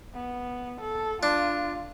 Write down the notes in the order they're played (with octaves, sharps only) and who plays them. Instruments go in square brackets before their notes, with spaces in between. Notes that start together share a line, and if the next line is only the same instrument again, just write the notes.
[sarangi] B3
A4
[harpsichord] D4 [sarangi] F4